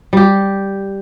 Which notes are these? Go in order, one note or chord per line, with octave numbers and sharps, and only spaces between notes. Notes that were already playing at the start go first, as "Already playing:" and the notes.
G3 G4